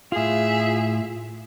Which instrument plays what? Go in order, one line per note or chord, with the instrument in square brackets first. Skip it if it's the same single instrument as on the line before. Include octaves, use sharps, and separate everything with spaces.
[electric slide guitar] A2 F4 [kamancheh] G#4 E5